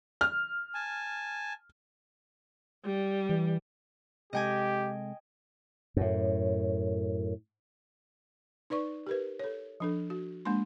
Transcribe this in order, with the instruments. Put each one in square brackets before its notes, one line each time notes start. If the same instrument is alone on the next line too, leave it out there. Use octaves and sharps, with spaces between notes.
[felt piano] F6
[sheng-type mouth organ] G#5 A5
[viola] G3
[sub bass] E3
[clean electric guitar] C3 G#3 A4 [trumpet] G4 [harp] D#5 G5 G#5
[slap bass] F#2 A2
[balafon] D#4 B4 D5 C#6
G4 A#4 B4
A4 C#5
F3 D4 A4
F#4
G#3 A#3 D4 C6